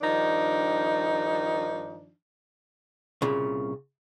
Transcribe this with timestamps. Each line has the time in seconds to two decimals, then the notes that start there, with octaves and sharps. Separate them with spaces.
0.01 G2 D#3 F3 D4 D#4
3.22 C2 A#2 C#3